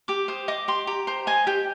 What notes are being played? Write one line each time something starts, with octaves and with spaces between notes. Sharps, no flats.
G4 D6
C5 D#6
D#5 D6
G4 C6
G4 A#5
C5 A#5
D#5 G#5
G4 G5